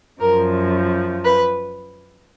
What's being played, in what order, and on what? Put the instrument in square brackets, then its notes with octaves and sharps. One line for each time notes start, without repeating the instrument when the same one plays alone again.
[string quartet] F#2 F3 A#4
B4